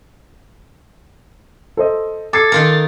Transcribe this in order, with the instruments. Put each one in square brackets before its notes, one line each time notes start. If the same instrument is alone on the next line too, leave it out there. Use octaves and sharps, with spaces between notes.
[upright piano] A4 C5 D#5
[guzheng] A4 [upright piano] D6 G#6 C7 [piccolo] A6
[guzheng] D#3 F4 A#4